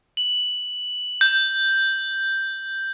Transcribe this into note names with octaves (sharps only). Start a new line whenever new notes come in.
F#7
G6